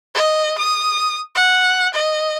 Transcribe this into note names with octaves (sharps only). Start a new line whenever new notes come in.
D#5
D#6
F#5
D#5